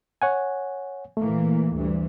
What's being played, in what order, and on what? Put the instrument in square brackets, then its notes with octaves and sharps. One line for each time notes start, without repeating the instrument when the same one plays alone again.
[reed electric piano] C#5 F#5 G#5
[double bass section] A#2 E3 A#3 [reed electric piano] A3
[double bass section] D2 G2 E3